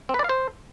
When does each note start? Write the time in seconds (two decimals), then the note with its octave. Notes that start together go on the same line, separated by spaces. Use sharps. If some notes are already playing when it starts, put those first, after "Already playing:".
0.09 C4
0.14 B4
0.19 D5
0.24 F5
0.29 C5